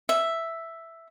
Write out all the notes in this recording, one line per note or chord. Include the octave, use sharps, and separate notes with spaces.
E5